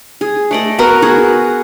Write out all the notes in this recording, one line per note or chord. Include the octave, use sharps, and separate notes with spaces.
G#4
A3 D5 D#5
B3 F#4 A#4
F#4 G#4